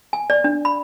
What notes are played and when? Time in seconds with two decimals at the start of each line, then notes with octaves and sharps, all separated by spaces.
0.13 G#5
0.30 D5
0.44 D4
0.65 B5